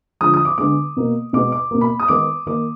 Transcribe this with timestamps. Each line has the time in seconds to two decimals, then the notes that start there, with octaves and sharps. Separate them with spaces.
0.21 D3 F3 G#3 D#6
0.34 D#6
0.45 D6
0.58 D3 G#3 B3 D6
0.97 B2 A#3
1.33 B2 G#3 B3 D6
1.52 D6
1.71 B2 A#3
1.81 B5
2.00 D#6
2.08 D#3 G#3 B3 D6
2.46 D#3 A#3 D6